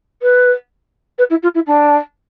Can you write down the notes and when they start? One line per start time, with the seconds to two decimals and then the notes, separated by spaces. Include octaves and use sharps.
0.22 B4
1.18 B4
1.30 E4
1.43 F4
1.54 E4
1.66 D4